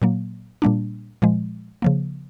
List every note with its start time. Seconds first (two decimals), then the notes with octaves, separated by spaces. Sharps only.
0.02 A#2 F#3 A#3
0.62 A#2 G3 A#3 D4
1.22 A#2 F3 G#3
1.82 C#3 F3 A#3